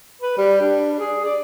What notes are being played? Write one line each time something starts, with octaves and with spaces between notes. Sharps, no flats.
B4
G3
D4
G#4
D5